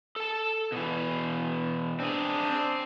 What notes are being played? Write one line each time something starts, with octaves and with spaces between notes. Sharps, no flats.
A4 A5
B2 E3
C4 D4 G#4
C4